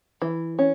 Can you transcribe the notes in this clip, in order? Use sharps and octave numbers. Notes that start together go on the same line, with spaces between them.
E3
C#4